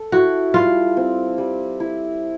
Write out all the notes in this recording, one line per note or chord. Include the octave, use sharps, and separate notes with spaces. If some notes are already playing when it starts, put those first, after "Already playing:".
Already playing: A4
E4 F#4
G3 F4
C4
G3
E4